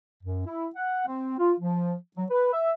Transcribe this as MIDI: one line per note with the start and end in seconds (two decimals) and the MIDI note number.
0.23 0.43 42
0.46 0.67 64
0.75 1.03 78
1.07 1.34 60
1.38 1.53 65
1.59 1.93 53
2.16 2.25 54
2.30 2.53 71
2.53 2.71 76